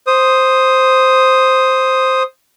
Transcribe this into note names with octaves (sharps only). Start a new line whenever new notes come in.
C5 D#6